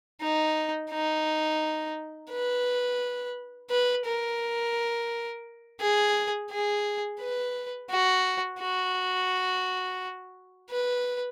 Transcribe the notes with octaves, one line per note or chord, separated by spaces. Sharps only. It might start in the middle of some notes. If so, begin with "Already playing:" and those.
D#4
D#4
B4
B4
A#4
G#4
G#4
B4
F#4
F#4
B4